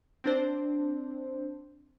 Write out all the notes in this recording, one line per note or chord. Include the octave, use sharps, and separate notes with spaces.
C4 D4 C5